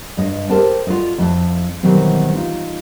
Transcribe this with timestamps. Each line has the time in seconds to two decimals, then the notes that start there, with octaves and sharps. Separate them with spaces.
0.17 G2 D#5
0.50 G4 A4 A#4 C5 G5 A5
0.87 F4 F#4 D5 D#5
1.18 F2 E4 A5
1.83 B2 D#3 E3 F#3 G3 C4
2.34 D#4 F4